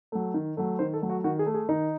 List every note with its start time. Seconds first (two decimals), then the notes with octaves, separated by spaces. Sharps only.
0.12 F#3 A3
0.34 D#3
0.57 F#3 A3
0.79 D#3 C5
0.94 A4
1.01 F#3 A3
1.10 F#4
1.24 D#3 F#4
1.39 G#4
1.46 A3
1.54 G#4
1.69 D#3 D#4